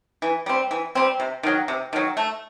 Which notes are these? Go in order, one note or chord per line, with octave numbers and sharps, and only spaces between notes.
E3
G3 C4
E3
G3 C4
C3
D#3 F#3
C3
D#3 F#3
A3